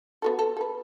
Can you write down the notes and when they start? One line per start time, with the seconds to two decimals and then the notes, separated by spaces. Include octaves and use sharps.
0.22 B3 F#4 A4
0.39 A4
0.57 A4 B4